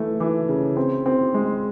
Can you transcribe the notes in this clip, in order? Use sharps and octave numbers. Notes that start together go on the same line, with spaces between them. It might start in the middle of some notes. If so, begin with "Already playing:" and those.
Already playing: E3 A3
E3
C#3
C4
C4
G#3